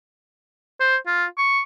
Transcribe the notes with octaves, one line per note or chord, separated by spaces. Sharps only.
C5
F4
C#6